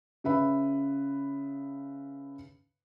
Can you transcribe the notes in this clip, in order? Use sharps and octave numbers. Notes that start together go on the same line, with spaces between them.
C#3 B4 E5 B5